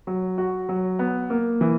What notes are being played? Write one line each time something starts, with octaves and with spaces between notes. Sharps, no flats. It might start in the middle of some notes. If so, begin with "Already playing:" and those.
F#3
F#4
F#3
B3
A#3
E3